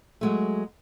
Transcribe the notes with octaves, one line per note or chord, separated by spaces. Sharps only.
F#3 G#3 A3